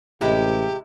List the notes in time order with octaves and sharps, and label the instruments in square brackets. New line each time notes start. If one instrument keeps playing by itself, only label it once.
[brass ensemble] A1 [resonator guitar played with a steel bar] C3 G#3 E4 [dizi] G4